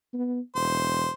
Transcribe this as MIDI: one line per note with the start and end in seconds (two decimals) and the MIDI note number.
0.13 0.39 59
0.55 1.07 28
0.55 1.11 72